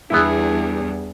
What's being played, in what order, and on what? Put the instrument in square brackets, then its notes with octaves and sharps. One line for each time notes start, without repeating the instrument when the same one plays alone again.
[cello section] E2 G3 [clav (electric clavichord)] B3 E4 [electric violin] D4 G#4